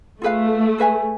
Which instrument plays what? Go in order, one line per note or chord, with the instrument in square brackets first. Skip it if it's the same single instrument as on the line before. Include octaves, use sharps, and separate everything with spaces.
[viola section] A3 [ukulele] F4 G#4 B4 F5
[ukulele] G#4 B4 E5 G#5